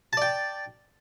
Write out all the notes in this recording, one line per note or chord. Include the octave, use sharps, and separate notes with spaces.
D5 G5 A5